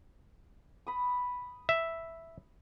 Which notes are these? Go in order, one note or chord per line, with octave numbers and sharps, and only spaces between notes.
B5 D#6
E5